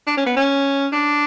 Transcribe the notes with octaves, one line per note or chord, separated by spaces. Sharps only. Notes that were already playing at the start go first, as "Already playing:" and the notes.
D4
C#4
B3
C#4
D4